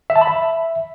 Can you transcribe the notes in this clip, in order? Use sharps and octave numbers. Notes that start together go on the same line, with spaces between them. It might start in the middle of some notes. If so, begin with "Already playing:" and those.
E5
A5
B5
E5